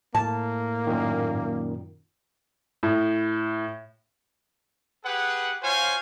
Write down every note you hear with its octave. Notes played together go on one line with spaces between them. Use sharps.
A2 A#3 A5
F#2 A#2 D#3
A2
G4 G#4 B4 F#5
F4 F#4 C5 C#5 F5 G#5